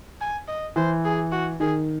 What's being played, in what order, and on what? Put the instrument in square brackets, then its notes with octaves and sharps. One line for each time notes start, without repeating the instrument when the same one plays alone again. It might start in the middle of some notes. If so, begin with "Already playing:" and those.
[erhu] G#5
D#5
[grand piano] E3 [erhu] C5
[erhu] G#4
F#4
[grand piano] D#3 [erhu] G#4